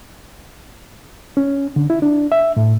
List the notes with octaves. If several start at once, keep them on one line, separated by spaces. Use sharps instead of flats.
C#4
D3
E4
D4
E5
A2